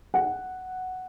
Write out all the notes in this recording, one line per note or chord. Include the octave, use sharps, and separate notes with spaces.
F#5